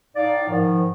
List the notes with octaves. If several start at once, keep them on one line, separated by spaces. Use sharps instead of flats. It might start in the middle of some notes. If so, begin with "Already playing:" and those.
A2 D#4 D5 F5
G#2 D#3 F3